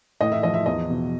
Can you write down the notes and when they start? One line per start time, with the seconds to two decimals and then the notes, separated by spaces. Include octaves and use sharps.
0.20 A2 D#5
0.32 E5
0.43 F3 D#5
0.54 E5
0.66 E2 D#5
0.90 B2